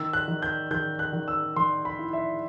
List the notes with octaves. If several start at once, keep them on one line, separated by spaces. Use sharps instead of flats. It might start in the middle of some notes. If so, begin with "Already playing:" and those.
Already playing: D#3 E6
F#6
D#3
G6
D#3 G6
F#6
D#3
E6
D#3 C6
B5
E4
E5